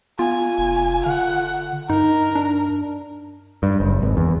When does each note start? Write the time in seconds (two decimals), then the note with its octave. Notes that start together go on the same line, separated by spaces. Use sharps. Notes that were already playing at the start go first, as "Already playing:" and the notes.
0.19 B3 F4 G#5
0.58 F1
1.06 D3 F#5
1.90 G2 D#4 A#4
2.35 D4
3.63 G2
3.80 F#1
4.02 G#1
4.17 E2